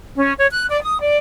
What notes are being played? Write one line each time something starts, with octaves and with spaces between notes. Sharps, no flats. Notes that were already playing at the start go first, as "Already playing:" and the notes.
C#4
C#5
F#6
D5
D#6
D5